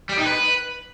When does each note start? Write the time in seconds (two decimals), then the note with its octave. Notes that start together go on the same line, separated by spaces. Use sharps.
0.09 G3
0.18 D#4
0.26 B4